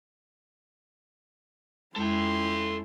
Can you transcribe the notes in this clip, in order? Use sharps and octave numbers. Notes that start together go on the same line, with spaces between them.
F2 G#3 C#4 E4 A4 G5 C6